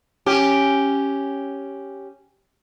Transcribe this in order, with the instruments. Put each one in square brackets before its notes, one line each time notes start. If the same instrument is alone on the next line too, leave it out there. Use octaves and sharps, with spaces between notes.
[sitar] C#4 G4